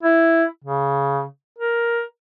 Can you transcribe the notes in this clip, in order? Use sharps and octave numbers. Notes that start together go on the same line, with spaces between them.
E4
C#3
A#4